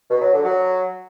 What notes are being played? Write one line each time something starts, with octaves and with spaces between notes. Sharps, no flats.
B2
F#3
D3
F#3